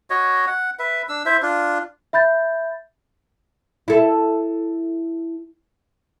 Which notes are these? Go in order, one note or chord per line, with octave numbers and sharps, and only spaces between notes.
F#4 C#5 D#5
F#5
B4 E5
D4 E6
E4 C5 E5
D4 F4
E5 B5 G6 A6
E4 A4